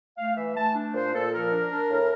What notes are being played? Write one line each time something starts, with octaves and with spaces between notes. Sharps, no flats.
A3 F5
E3 E5
A3 A5
D4
A#2 C5
A#2 A4
F3 A#4
D4
D4
A2